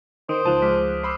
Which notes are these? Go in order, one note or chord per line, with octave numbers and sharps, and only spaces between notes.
D#3 C5 D#6 D7
C#2 F3 A5 F#6 D#7
G#3 D6 F6 B6
C5 B5 C6 D6 E6 C7